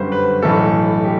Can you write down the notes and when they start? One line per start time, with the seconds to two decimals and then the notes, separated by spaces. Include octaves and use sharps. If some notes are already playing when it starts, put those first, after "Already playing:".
Already playing: G1 F#2 D3 G3 B4 C5
0.12 B4
0.42 B1 A2 E3 A4
1.04 G4